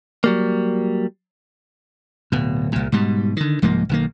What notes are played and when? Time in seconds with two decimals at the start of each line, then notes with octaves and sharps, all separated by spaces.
0.24 F#3 G3 A#3
2.32 D1 B2
2.72 C2 A#2
2.92 G#2 B2 G3
3.37 D3 D#3
3.62 C2 G#2 F3 A#3
3.89 B1 D#3 A#3